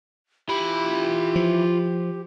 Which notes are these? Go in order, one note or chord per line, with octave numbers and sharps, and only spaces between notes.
E3 F4 G4 B5
F3